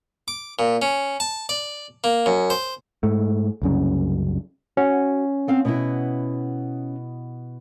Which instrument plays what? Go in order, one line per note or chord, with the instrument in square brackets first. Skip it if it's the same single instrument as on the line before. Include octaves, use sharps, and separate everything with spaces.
[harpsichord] D6
A#2
C#4
A5
D5
A#3
F#2
C5
[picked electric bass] G#2 A3
C2 F#2 C#3
[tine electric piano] C#4 [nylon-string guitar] F#4
[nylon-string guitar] B3 C4 F5
B2 B3 E4